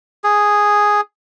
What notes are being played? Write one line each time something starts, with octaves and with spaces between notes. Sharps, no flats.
G#4